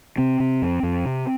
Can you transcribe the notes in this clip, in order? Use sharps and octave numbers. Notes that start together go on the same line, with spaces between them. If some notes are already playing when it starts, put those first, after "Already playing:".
C3 C4
C3
F2
F2
C3